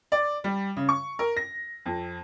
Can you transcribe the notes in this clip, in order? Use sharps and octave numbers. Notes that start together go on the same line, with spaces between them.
D5
G3
C#3
C#6
A#4
A#6
F2